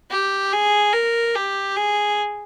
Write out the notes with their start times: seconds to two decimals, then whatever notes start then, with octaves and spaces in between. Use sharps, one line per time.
0.11 G4
0.52 G#4
0.93 A#4
1.35 G4
1.76 G#4